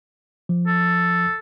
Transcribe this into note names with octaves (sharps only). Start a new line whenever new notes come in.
F3
A4